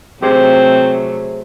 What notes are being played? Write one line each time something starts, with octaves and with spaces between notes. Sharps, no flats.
C3 F#3 A3 C4 G4 G#4 C5